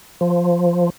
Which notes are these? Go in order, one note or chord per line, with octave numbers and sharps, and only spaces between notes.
F3